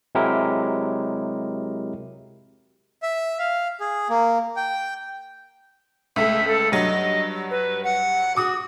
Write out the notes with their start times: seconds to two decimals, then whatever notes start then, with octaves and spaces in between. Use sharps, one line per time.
0.15 C3 F#3 G#3 E4 G4 A#4
3.03 E5
3.39 F5
3.80 G#4
4.10 A#3
4.56 G5
6.16 C#2 A3 E5
6.48 A4
6.72 G2 F#3 D#5
7.51 B4
7.84 F#5
8.36 F#4 D6 D#6